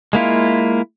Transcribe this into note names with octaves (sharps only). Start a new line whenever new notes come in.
G#3 A#3 E4 F4